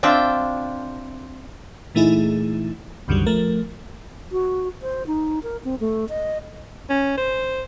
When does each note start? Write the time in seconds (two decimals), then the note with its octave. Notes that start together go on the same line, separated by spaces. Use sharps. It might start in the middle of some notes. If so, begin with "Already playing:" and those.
0.03 C4 D4 F4 E5 G5
1.95 A#2 E3 A3 D#4 E4 G#4
3.08 C2 F#2 D3 D#3 F#3 G3
3.26 F3 A3 A#4
4.32 F#4
4.82 C5
5.07 D#4
5.43 A#4
5.64 C4
5.80 A3
6.09 D#5
6.89 C#4
7.17 C5